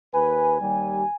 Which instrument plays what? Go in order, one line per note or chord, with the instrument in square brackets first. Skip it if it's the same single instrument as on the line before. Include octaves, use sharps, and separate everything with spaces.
[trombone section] D#2 B4 [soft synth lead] G#5
[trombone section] D#2 G3